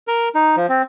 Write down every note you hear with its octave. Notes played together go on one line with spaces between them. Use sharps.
A#4
D#4
F3
C4